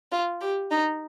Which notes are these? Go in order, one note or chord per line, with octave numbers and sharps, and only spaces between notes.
F4
G4
D#4